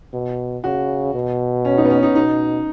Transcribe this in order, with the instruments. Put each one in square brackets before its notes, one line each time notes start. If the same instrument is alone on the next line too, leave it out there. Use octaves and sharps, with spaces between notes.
[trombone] B2
[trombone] C#3 [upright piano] F#4
[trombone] B2
[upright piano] C#4
D#4
B3
C#4
D#4
[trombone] B2 [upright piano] D#4